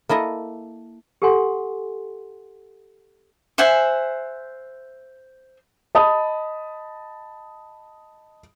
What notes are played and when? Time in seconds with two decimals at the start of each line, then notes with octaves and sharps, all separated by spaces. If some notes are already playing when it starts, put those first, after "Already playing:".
0.09 A#3 E4 A4 D#5
1.22 G4 A4 F#5 G#5 C6
3.58 C5 E5 F#5 G#5
5.95 D#5 A5 B5 D#6